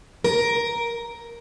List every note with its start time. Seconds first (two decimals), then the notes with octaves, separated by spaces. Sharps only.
0.24 A#4